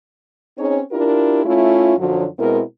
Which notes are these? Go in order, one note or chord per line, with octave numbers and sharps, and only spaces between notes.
C4 C#4 D#4 G#4 C#5
D4 E4 F4 G4 A#4
A3 C#4 E4 F4
F#2 D3 F3 F#3
B2 G#3 C4 E4 A#4